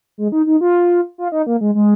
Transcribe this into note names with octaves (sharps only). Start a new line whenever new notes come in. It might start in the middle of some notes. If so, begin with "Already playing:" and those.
G#3
D#4
D#4
F4
F4
D#4
A#3
G#3
G#3